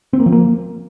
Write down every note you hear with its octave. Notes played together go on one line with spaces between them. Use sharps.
C4
A#3
F3
A#3